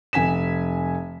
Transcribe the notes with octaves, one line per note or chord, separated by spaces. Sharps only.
F1 G#5 B6 E7